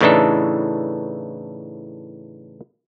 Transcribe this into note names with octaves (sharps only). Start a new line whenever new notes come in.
A2 C#3 E3 D4 D#4 A4